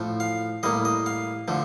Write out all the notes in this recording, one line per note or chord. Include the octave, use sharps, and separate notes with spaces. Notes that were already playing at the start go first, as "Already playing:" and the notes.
Already playing: A2 F3 A3
F5
A2 G3 A#3 D#5
D#5
F5
D3 F3 A3